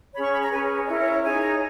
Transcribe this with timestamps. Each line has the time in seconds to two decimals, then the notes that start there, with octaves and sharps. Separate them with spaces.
0.14 C#4 G#4 C#5 B5
0.23 C#6
0.32 B5
0.42 A#5
0.51 C#4 G#4 B4 G#5
0.75 C#5
0.87 C#4 E4 A#4 D#5
0.99 C#5
1.12 C#5
1.23 D#4 G#4 C#5 G#5
1.41 A#5